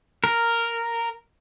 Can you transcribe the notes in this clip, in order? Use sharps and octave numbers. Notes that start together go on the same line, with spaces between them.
A#4